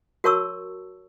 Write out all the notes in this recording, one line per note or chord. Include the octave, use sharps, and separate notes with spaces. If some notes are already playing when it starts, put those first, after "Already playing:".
F#4 A#4 C#5 A5 C#6 E6